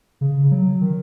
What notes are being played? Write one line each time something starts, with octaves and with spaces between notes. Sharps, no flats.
C#3
F#3
D#3